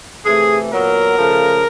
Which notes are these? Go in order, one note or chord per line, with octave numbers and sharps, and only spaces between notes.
C3 E3 A3 G#4
A#2 F#3 B3 A#4
C#3 F3 A3